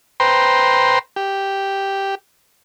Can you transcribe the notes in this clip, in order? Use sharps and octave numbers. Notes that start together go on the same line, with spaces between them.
B4 C5 G5 A#5 C6
G4